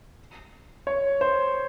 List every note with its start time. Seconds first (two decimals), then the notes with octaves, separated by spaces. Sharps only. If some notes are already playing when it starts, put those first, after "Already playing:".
0.87 C#5
1.21 C5